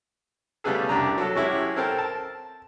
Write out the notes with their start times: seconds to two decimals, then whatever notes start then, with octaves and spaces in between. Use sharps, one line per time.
0.64 C#3 G3 A3 B3 G#4 A4
0.89 C2 D4 G4 A#5
1.18 F#3 A4
1.35 F#3 G#3 C#4 E4 G4
1.77 C4 A4 A#4 G5 A5
1.98 A5